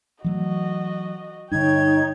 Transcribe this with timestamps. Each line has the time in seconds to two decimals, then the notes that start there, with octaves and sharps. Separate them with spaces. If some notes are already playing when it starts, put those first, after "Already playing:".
0.24 E3 F#3 A3 F#4 D#5
1.51 G2 D3 D#4 C#5 G5 G#6